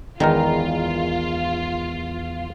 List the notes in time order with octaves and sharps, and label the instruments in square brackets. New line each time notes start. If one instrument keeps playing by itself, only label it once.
[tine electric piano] E2 [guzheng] D#3 [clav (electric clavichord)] E3 G#3 A#4 [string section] F4